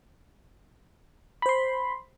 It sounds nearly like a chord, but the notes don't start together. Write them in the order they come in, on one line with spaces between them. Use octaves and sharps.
B5 C5 C6